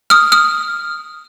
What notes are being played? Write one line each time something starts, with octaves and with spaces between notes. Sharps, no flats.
D#6 F6
D#6 F6